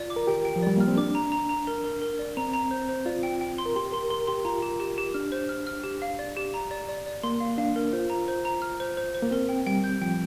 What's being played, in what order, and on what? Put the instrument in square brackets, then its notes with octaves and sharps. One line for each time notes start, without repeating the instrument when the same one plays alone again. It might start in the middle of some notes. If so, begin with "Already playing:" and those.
Already playing: [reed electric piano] F4 [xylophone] D5
[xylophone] D6
[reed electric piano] A#4
[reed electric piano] G4 [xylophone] G5
[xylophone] G5
[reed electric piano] F3
[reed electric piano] G3 [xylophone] D5
[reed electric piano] A#3 [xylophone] F6
[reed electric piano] C4
[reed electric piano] D4 [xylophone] D6
[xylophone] A#5
A#5
A#5
A#4
A#4
A#4
D5
[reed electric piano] C4 [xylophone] A#5
[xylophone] A#5
C5
C5
[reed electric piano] F4 [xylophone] D5
[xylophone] G5
G5
C6
[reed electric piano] A#4
[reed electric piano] G4 [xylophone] C6
[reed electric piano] A#4 [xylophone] C6
[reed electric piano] A#4 [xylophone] C6
[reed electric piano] G4 [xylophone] C6
[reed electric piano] F4 [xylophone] A#5
[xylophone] G4
G4
G4
[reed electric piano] D4 [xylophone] F6
[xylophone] C5
F6
F6
G4
F5
D5
G4
A#5
D5
D5
D5
[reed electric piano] A#3 [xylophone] C6
[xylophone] F5
[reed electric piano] D4 [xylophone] F5
[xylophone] A#4
[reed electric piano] F4 [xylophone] C5
[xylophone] A#5
C5
A#5
F6
C5
C5
C5
[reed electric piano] A#3
[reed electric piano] C4 [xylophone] A#4
[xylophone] G5
[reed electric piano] G3 [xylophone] G5
[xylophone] G6
[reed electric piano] F3 [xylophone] G5